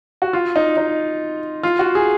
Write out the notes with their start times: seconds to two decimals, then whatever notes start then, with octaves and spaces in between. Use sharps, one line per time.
0.22 F#4
0.33 F4
0.56 D#4
0.77 D#4
1.63 F4
1.79 F#4
1.95 G#4